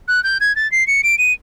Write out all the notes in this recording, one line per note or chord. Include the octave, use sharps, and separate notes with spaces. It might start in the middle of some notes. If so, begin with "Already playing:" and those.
F#6
G6
G#6
A6
C7
C#7
D7
D#7